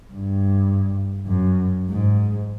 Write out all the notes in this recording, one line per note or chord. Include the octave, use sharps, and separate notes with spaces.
G2
F#2
G#2